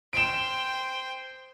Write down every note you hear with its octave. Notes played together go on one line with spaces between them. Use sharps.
C5 G5 D7 E7